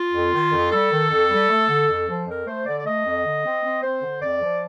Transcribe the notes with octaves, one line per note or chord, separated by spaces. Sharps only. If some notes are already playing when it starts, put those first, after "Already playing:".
Already playing: F4
F2
D#3
F2
G3 A4
D#3
F2
G3
A3
D3
F2
F3
F2 A#4
A3 C5
D3 D5
D5
A3 D#5
F2
D3
C4
C4
C4 C5
D3
F2 D5
F3